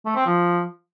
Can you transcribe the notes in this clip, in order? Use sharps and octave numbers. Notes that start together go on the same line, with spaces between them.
A3
C4
F3